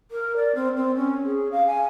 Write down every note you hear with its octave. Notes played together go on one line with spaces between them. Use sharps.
A#4
D5
C4
C4
C#4
G#4
F5
G#5